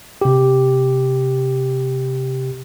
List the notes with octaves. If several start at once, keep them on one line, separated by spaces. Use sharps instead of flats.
C3 G4